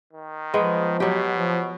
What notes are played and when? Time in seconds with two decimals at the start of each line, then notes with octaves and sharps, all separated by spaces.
0.13 D#3
0.54 F3 G#3 B3
1.00 B2 F#3 G4
1.33 F3